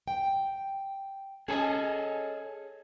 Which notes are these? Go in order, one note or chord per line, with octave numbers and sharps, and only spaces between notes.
G5
C#4 G#4 A4 C#5 D#5 G#5